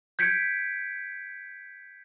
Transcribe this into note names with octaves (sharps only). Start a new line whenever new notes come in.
G6 G#6 B6 C#7 D7